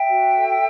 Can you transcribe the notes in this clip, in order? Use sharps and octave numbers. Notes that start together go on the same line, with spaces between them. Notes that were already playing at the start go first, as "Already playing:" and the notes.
Already playing: E5 G5
F#4
A4